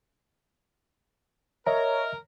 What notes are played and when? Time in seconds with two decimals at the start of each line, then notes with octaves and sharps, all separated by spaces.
1.67 A#4 C#5 D#5 E5 A#5